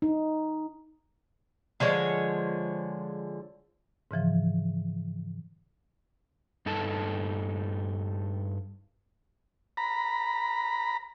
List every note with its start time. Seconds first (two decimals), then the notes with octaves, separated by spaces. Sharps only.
0.02 D#4
1.80 D3 F3 G#3 C#5
4.11 G#2 C#3 E3 F3
6.66 G2 D#4 A4 A5
9.77 A#5 B5